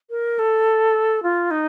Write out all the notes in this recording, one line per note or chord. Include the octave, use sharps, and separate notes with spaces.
A#4
A4
F4
D#4